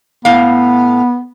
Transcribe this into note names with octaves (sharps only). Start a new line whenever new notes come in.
A2 B3 F5